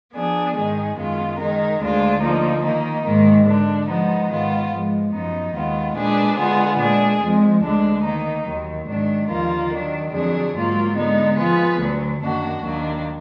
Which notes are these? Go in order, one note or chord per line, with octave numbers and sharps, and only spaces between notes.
F3 B3 D4 G#4
G#2 D#3 G#3 D#4 G#4
F#2 D#3 G#3 B3 F4
D#3 G#3 D#4 A#4
D2 D3 G#3 D4 F4
D3 F3 A#3 D#4
D#3 A#3 D#4
G#2 D#3 A#3
D3 G#3 D4
F3 G#3 B3 D#4
G#2 D#3 G#3 B3 F4
G#2 F3 G#3
F#2 F3 B3 D#4
D#2 D#3 G#3 B3 F4
A#2 G#3 D4 G#4 B4
D3 G#3 B3 F4 G#4
A#2 G#3 D4 G#4
F2 F3 G#3
D2 D3 G#3 D4
D#3 A#3 D#4
D#2 D#3 F#3
G#2 D#3 F#3 D4
D#2 D3 F3 A#3 F4
D#3 F#3 D4
F2 D3 F#3 D4 G#4
G#2 F#3 A#3 F4
D3 G#3 B3 D#4
F3 B3 F4 G#4 B4
D2 D3 F#3
F#2 D#3 A#3 D4 F#4
D#2 D#3 F#3 A#3 D4